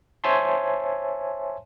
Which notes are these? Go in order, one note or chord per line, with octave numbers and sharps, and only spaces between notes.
C5 C#5 E5 G#5 A5 C6